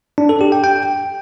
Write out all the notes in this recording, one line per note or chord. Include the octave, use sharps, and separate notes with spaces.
D4
A4
G4
G5
G5